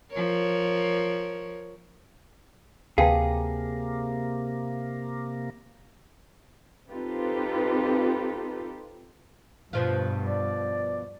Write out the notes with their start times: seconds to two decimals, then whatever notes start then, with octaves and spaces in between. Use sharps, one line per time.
0.11 F3 A#4 C#5
2.98 D2 C3 A#3 G#4 B4 F5 G5 A5
6.90 C4 D#4 F4 G4 A4 B4
9.73 G2 B2 F3 F4
10.26 D5